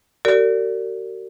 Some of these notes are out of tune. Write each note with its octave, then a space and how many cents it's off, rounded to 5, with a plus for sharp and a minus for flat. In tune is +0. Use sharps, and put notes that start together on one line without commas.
F#4 +45 A#4 -40 D5 -25